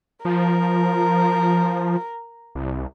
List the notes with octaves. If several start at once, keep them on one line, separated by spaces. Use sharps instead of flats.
F3 A#4
C2